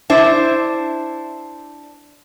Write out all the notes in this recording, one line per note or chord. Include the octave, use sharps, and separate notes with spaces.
D4 E4 C5